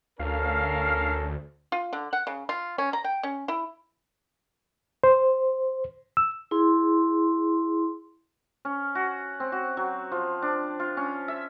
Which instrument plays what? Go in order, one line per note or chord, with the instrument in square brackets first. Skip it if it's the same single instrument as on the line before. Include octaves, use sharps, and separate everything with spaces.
[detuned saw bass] D2 [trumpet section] C#4 A4 A#4 [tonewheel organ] F5
[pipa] F4
D3
F#5
C#3
F4
C#4
A#5
G5
C#4
E4
[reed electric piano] C5
E6
[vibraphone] E4 G#4 C6
[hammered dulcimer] C#4
F#4
C4
F#4
F#3
F3
D4
F4
C#4
E5